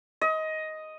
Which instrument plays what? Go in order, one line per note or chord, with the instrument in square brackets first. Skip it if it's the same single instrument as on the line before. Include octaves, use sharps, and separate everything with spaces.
[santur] D#5